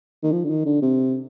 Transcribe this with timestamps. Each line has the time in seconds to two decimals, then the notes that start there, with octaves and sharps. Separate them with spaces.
0.23 D#3
0.32 F3
0.44 D3
0.50 D#3
0.66 D3
0.82 C3